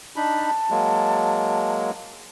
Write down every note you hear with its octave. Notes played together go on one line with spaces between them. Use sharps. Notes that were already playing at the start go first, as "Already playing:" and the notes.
D4 D#4 A5 B5
F#3 G#3 A#3